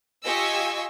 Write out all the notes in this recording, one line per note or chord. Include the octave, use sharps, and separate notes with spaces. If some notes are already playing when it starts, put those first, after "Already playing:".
F4 G4 D#5 G#5 C#6 E6